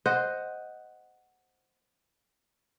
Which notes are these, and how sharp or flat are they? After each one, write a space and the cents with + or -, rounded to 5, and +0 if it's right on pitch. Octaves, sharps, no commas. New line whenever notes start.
C5 +0 D#5 +0 F#5 +0